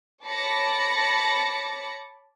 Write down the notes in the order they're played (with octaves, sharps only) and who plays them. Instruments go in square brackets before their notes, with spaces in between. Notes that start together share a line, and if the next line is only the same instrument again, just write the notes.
[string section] C#5 A5 B5 D6 A#6 C#7